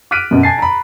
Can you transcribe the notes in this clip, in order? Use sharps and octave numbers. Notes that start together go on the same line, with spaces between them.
D6 F6 F#6 B6 D7 D#7
F#2 B2
G#5 A5 A6 C7
A#5 B5